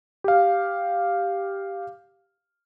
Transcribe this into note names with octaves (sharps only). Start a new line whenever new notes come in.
G4 F5